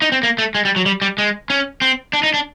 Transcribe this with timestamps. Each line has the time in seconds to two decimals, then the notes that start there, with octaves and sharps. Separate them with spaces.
0.02 D#4
0.12 C4
0.23 A#3
0.38 A3
0.55 G#3
0.65 G3
0.76 F#3
0.86 G3
1.02 G3
1.18 G#3
1.50 C#4
1.81 C4
2.13 D4
2.23 D#4
2.34 D4